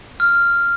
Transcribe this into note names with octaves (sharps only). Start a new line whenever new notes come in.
F6